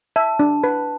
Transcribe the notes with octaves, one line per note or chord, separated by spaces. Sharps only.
E5 A5
D4
B4